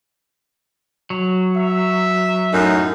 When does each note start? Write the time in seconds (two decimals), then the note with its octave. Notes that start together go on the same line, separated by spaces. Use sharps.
1.10 F#3
1.57 E5
2.53 F#2 A2 D#4